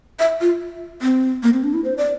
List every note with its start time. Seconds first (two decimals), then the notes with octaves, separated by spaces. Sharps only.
0.19 E5
0.41 F4
1.02 C4
1.43 A#3
1.53 C4
1.64 D4
1.74 E4
1.84 C5
1.98 D5